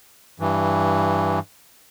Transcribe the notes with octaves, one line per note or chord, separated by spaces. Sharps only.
G2 E3